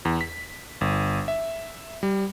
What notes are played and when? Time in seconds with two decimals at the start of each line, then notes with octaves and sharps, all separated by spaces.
0.05 E2
0.21 B6
0.81 G1
1.28 E5
2.03 G3